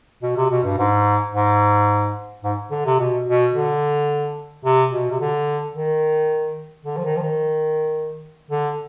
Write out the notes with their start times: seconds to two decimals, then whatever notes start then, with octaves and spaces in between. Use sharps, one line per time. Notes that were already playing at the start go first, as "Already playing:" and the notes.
0.23 B2
0.37 C3
0.50 B2
0.64 G2
0.78 G#2
1.34 G#2
2.44 G#2
2.71 D3
2.86 C3
2.99 B2
3.27 B2
3.54 D3
4.65 C3
4.93 B2
5.11 C3
5.20 D3
5.75 D#3
6.85 D3
6.97 F3
7.04 D#3
7.16 F3
7.22 D#3
8.51 D3